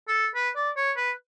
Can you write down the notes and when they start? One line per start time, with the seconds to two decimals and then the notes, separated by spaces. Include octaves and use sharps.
0.08 A4
0.35 B4
0.56 D5
0.77 C#5
0.97 B4